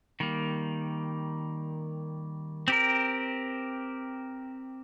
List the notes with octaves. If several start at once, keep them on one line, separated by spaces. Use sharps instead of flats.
D#3 G3 A#3
C4 G4 A#4